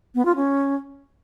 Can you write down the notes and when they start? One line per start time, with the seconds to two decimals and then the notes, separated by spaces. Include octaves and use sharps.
0.15 B3
0.25 F4
0.36 C#4